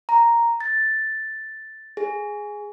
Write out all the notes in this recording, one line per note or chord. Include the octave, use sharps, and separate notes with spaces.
A#5
A6
G#4